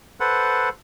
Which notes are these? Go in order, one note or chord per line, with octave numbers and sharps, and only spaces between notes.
A4 B4 C5 F#5